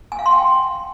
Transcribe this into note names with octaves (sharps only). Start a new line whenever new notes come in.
G#5
F5
C6
G5